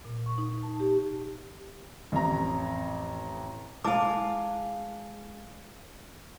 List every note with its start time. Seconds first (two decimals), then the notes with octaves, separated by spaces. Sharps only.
0.05 A#2
0.26 C#6
0.38 D#4
0.63 A5
0.80 G4
2.12 A1 F2 A#5
3.84 G#3 E4 F5 A5 D6